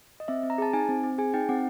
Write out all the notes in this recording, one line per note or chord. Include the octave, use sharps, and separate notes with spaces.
D#5
C4 E5
C4
A#5
G#4 A5
D#4 G#5
C4
C4
G#4 G#5
D#4 G5
C4 F#5